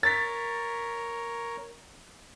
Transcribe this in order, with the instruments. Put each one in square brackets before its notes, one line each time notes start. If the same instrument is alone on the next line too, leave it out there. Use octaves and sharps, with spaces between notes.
[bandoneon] A#4 C#5 [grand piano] A6 B6